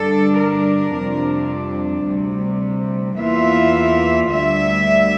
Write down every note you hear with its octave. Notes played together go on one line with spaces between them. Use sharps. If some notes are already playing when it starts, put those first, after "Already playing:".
Already playing: G2 D3 G3 D4 A4
A#4
F2 C3 G3 D4
D2 C3 G3
E2 E3 A#3 F4 E5
D2 D3 G3 E5